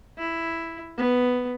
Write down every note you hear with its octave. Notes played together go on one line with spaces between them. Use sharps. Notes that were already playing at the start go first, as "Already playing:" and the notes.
E4
B3